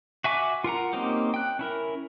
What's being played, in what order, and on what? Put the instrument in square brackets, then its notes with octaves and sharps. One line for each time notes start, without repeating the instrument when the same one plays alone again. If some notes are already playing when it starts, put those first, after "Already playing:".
[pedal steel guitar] F#4 E5 G#5 C#6 D6
F4 A#4 F#5 A#5
A#3 C4 C#4 D#4 G4
G5 F#6
C#4 E4 A#4